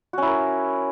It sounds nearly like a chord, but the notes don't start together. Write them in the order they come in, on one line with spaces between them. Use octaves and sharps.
F#4 C#4 E4 A#4